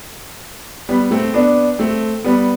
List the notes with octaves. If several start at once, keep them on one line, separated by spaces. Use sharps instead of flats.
G3 B3
A3 C4
B3 D4
A3 C4
G3 B3